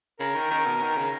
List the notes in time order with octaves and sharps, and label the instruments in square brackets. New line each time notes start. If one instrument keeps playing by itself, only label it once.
[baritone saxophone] C#3 [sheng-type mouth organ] A#4
[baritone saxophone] D#3
D#3
B2
D#3
C#3